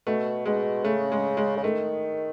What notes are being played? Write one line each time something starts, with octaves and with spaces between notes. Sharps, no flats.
B2 A3
B2 G#3
C#3 A3
G#3
G#3
C#3
D#3 A3